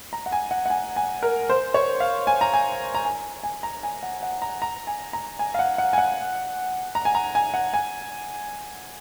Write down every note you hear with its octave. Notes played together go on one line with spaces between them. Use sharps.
A#5
F#5
G#5
F#5
F#5
G#5
G#5
A#4
C5
C#5
F5
G#5
A#5
G#5
A#5
G#5
G#5
A#5
G#5
F#5
F#5
A#5
A#5
G#5
A#5
G#5
F5
F#5
F#5
G#5
F#5
A#5
G#5
A#5
G#5
F#5
G#5